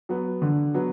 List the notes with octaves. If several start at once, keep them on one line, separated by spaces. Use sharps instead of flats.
F#3 B3
D3
F#3 B3